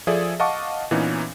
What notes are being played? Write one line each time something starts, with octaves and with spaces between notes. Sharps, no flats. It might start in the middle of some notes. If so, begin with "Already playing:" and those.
F3 G#4 A4 D5 E5
D#5 F5 F#5 A5 C#6 D6
A#2 E3 B3 C#4 D#4